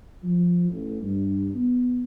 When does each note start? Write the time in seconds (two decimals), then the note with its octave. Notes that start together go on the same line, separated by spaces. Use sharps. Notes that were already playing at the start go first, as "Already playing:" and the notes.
0.23 F3
0.69 A1
1.01 G2
1.54 B3